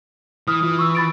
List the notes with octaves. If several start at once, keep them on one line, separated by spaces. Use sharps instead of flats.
E3 D#6 F6
E3 F4
C#6 E6
B5 A6 D7